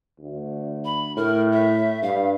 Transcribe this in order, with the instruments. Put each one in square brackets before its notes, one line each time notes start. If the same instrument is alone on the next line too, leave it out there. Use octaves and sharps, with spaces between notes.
[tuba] D2
[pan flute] B5
[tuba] A2 [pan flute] A#4
[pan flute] E5
[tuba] G2 [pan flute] F5